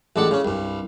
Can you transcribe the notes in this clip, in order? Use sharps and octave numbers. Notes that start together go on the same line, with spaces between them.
A1 G#3 D4 A4 F#5
C#3 C#4
C2 G2